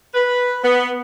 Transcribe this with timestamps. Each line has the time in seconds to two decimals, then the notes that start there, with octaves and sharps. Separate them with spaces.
0.13 B4
0.62 B3